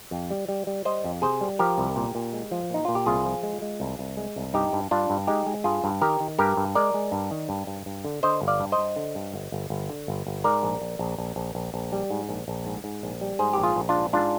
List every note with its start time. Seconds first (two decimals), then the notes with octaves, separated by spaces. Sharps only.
0.11 F2
0.30 G3
0.49 G3
0.67 G3
0.85 G3 C5 D#5
1.04 F2
1.22 C3 G#4 C5
1.41 G3
1.59 F3 G4 A#4
1.78 C2
1.96 A#2
2.15 A#2
2.33 G#3
2.51 F3
2.70 A#2 D#4
2.85 A#2 F4
2.95 G4
3.06 C2 F4 G#4
3.25 F3
3.43 G#3
3.62 G#3
3.80 C2
3.99 C2
4.17 G#3
4.36 C2
4.54 G2 D#4 G4
4.73 G2
4.91 G2 D4 F4
5.10 G2
5.27 G#3 D#4 G4
5.46 G#3
5.64 G2 F4 G#4
5.84 G2
6.01 D#3 G4 A#4
6.21 D#3
6.39 G2 G4 A#4
6.57 G2
6.75 G#3 A#4 D5
6.94 G#3
7.12 G2
7.31 D#3
7.49 G2
7.67 G2
7.86 G2
8.05 D3
8.23 D3 C5 D#5
8.42 G1
8.48 D5 F5
8.60 G2
8.72 C5 D#5
8.78 G2
8.96 D3
9.15 G2
9.34 G1
9.52 G1
9.70 G1
9.90 D3
10.08 G1
10.27 G1
10.44 G#2 A#4 D5
10.63 A#1
10.82 A#1
10.99 A#1
11.18 A#1
11.36 A#1
11.55 A#1
11.74 A#1
11.92 G3
12.10 G#2
12.29 A#1
12.48 A#1
12.66 G#2
12.84 G#2
13.03 A#1
13.21 G3
13.39 G#2 G#4 C5
13.53 A#1 G4
13.63 F4 G#4
13.76 A#1
13.89 D4 F4
13.95 G#2
14.13 G#2 D4 F4